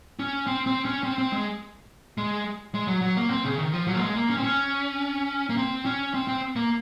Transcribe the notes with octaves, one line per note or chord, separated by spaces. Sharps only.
C#4
C4
C4
C#4
C4
C4
G#3
G#3
G#3
F#3
F#3
A#3
C4
C#3
D#3
F3
F#3
A#3
G#3
A#3
C#4
C4
C#4
A#3
C4
C#4
C4
C4
A#3